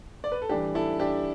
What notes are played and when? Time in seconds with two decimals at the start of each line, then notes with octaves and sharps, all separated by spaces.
0.24 D5
0.32 B4
0.42 A4
0.49 A2 E3 G3 D4 G4
0.75 E4 A4
0.99 D4 G4